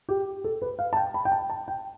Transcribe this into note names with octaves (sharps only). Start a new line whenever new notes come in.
G4
A4
B4
F5
A5
G5
B5
G5
A5
A5
G5